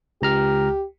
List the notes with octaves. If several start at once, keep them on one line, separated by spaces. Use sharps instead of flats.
C#2 G4 A#5 F6